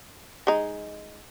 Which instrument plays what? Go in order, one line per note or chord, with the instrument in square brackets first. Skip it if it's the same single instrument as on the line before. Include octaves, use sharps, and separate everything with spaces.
[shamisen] G#3 D#4